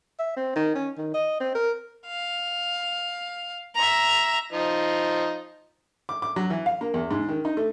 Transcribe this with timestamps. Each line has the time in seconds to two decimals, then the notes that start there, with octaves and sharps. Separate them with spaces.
0.19 E5
0.37 C4
0.56 D#3
0.75 C#4
0.98 D#3
1.14 D#5
1.41 C4
1.55 A#4
2.07 F5
3.75 E5 A#5
4.52 F3 D#4
6.09 D6
6.22 D6
6.36 F#3
6.50 E3
6.66 F5
6.81 A#3
6.94 E2
7.11 G#2
7.29 D#3
7.45 D#4
7.57 A3